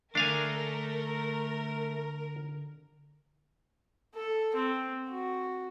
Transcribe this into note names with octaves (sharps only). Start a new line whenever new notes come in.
D3 A3 D4 A#4 F5 G#5
A4
C4
F#4